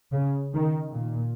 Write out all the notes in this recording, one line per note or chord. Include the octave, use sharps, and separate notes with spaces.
C#3
D#3
A#2